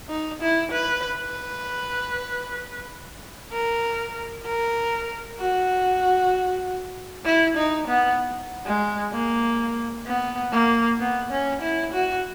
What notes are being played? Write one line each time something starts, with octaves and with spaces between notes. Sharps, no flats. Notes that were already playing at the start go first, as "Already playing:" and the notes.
D#4
E4
B4
B4
A#4
A#4
F#4
E4
D#4
B3
G#3
A#3
B3
A#3
B3
C#4
E4
F#4